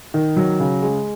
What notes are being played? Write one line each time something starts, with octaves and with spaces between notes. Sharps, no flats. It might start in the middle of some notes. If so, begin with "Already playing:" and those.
D#3
F#3
C#3
G#3